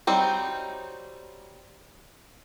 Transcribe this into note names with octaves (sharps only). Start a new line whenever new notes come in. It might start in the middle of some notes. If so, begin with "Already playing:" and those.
F#3 G3 C4 D#4